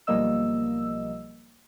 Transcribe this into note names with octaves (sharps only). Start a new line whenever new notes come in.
B1 F3 G3 A#3 D#5 E6